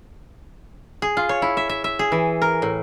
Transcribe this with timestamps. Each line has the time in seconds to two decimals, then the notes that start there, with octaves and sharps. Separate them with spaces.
1.02 G#4
1.17 F4
1.29 C#5
1.42 E4
1.57 E5
1.69 E5
1.84 E5
1.99 G#4
2.12 E3
2.42 A#4
2.62 A2